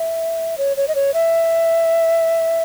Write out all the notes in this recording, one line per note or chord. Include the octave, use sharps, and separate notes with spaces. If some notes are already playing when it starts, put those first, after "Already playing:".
Already playing: E5
C#5
C#5
D#5
C#5
E5